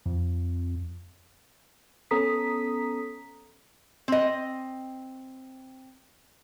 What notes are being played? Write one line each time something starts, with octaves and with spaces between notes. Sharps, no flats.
F2
B3 C#4 A4 A#5 D#6 B6
C4 D#5